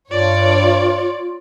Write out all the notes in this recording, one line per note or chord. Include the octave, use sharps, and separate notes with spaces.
G2 F4 C#5 D5